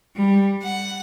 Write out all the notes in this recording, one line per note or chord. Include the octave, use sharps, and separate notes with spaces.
G3
F#5